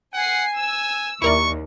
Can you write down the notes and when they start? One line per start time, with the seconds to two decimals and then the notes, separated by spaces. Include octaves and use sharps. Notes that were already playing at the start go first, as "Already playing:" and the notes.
0.14 F#5 G#5 C7
0.55 G#5 E6
1.22 D#2 E4 A#4 D5 C#6